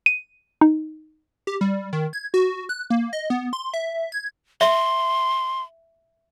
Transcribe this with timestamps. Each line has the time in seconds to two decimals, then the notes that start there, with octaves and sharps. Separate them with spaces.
0.06 D#7
0.61 D#4
1.47 G4
1.61 G3
1.93 D#3
2.13 G#6
2.34 F#4
2.69 F#6
2.90 A#3
3.13 D#5
3.30 B3
3.53 C6
3.74 E5
4.12 G#6
4.61 E5 C6